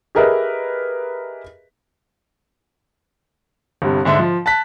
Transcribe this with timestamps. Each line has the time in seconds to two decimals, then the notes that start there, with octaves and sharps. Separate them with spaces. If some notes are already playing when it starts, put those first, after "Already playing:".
0.15 G4 G#4 A#4 B4 D#5 E5
3.82 G1 G2 C3
4.05 G#2 D3 E5
4.19 F3
4.46 A5 F#6 B6